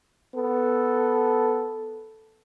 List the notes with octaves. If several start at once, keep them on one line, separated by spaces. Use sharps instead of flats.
B3 A4